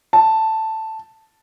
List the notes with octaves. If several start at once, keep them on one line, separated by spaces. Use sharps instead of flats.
A5